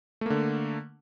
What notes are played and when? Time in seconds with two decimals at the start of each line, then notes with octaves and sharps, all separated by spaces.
0.21 A3
0.26 A#3
0.30 D3